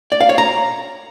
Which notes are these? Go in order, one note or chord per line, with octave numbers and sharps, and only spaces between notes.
D5
F5
C#5
A#5